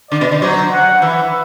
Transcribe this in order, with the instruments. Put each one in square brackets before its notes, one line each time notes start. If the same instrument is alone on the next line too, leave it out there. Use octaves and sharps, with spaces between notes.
[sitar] D3 [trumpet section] D5
[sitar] B2
D3
[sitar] F#3 [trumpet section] C5
[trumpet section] F#5
[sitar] E3 [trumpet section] E5